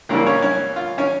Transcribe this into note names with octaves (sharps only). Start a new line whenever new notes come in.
C#2 C#3 E3 G3 A#3 A#4
C#4 C#5
C#4 C#5
F4
C#4 C#5